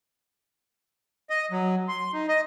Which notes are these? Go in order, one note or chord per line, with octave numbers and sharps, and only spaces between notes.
D#5
F#3
C6
D#4
D#5